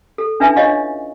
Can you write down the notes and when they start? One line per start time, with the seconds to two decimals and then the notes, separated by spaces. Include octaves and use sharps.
0.18 A4
0.40 C#4 D4 E4 B4 E5 G#5
0.56 D4 F4 C#5 D#5 F5 C#6